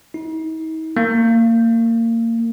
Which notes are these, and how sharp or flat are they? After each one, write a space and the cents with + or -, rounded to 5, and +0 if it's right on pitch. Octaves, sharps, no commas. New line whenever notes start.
D#4 +45
A#3 -25